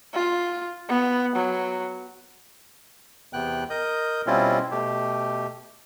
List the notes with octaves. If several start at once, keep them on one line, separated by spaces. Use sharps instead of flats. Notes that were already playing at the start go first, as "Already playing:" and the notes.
F4
B3
F#3
E2 C3 B3 G5 F#6
A#4 D#5 D#6 G6
B2 G3 C4 C#4 E4 F4
B2 A3 G4